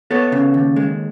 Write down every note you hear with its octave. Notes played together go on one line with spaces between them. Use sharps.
B3 A4 C#5
C#3
D#2
G#3